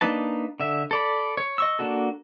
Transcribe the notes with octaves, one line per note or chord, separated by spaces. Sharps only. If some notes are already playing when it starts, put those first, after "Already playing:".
A#3 D4 D#4 B4 A5
D3 E5
A4 D5 B5
C#5
D#5 C#6 E6
A#3 D4 F#4 A4